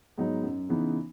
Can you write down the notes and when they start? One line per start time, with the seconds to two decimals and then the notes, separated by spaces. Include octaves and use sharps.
0.18 G#2 F#3 B3 D#4
0.43 F#2
0.69 C#3 E3 B3 D#4